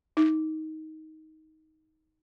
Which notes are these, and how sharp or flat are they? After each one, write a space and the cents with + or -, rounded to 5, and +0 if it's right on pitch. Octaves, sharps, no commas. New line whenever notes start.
D#4 +15